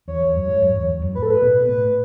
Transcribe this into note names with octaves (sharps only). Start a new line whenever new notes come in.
E2 C#5
E2
F#2
G#2
F#2
E2
E2
F#2
A2 B4
A4
B4
B2
A2